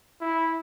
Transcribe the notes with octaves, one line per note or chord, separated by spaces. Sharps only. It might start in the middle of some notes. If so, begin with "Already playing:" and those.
E4